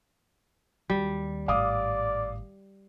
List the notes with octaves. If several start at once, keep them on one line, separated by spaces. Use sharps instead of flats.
D#2 G3
G#1 A2 D5 F5 D6 D#6